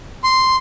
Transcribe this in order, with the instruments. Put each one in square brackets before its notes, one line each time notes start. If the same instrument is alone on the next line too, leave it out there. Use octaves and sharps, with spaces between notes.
[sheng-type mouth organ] C6